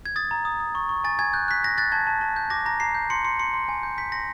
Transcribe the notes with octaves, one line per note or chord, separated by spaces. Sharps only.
G#6
D#6 A6
A#5
D#6
D#6
C#6
C#6
G#5 A6
G#5 G#6
F#6 G6
F#6 B6
F#6 A#6
F#6 A6
A5 G#6
A5
A5
G6
D6 A#6
A#5 A#6
A#5 C7
G6
C6 C#7
C6 C#7
C6 C#7
C6
G#5
G6
G6 B6
C6 A#6